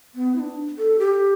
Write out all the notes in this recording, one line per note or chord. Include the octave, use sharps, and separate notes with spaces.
B3
E4
D4
A4
G4